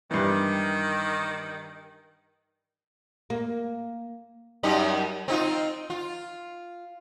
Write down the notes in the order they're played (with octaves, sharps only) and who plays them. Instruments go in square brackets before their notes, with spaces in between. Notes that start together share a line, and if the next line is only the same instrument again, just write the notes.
[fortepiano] G2 E3 [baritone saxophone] D#3
[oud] A#3
[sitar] F#2 G3 D#4
C4 D#4 F4
F4